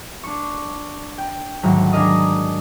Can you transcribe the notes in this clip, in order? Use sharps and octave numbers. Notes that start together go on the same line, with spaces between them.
D4 C#6
G5
D2 G#2 D#3 F#3
D4 G#4 A#4 D#5